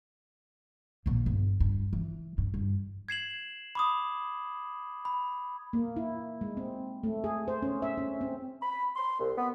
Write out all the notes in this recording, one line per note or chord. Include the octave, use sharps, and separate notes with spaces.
A#1 A#2
G1
G2
E3
G2
G2
G#6 C7 E7 F#7
B5 D6 D#6
B5
A#3
E4
G#3
C4
A3
G#4
C5
C#4
E5
C#4
C4
B5
C6
C2
B3